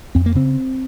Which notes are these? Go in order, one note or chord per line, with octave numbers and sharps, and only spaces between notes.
F2 C4
A#3
C#3 C4